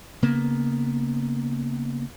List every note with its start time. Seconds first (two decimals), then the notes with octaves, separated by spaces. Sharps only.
0.22 C#3 A#3 B3